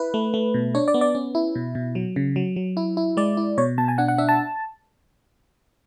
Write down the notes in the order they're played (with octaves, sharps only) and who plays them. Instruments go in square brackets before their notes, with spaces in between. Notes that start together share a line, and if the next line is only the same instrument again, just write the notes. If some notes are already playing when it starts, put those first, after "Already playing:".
Already playing: [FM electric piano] E4 B4
A3
A3
B2
D4 C#5
D5
B3
D5
C#4
E4
B2
B2
F#3
C#3
F#3
F#3
E4
E4
G#3 D5
E4
B2 C#5
B2 A5
G#5
D4 F#5
F#5
D4 E5
A5